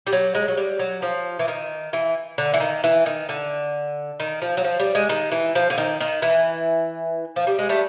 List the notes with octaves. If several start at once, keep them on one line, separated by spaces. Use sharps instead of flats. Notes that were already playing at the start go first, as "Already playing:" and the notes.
G3
F#3
G#3
F#3
G3
F#3
F3
E3
D#3
E3
D3
E3
D#3
E3
D#3
D3
D#3
F3
F#3
F3
G3
G#3
D#3
E3
F3
D3
D#3
D#3
E3
F3
G3
G#3
G3 A3